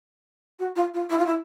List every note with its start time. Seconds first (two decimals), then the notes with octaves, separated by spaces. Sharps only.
0.59 F#4
0.76 F4
0.94 F4
1.10 E4
1.18 F4
1.26 E4